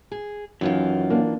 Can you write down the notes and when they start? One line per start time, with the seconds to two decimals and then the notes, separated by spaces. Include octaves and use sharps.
0.11 G#4
0.61 F#2 D#3 E3 F4
1.10 A#3 D4